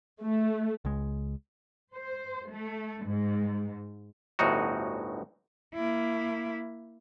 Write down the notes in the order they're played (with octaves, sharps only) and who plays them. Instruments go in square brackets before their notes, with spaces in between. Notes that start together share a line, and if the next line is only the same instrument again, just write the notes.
[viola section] A3
[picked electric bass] C#2 G#3
[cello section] C5
A3
G#2
[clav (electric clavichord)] G1 D2 A2 D#4 F#4
[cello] A#3 E4